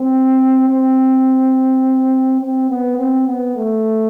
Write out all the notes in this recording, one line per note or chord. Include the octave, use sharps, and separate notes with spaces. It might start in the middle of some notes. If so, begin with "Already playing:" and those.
Already playing: C4
C4
C4
B3
C4
B3
A3